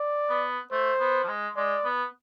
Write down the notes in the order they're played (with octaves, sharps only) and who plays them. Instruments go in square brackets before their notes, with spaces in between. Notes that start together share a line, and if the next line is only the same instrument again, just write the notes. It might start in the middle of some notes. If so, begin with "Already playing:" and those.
Already playing: [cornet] D5
[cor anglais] B3
[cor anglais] A3 [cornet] C5
[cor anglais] B3
F3
G#3
[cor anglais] G#3 [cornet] D5
[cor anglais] B3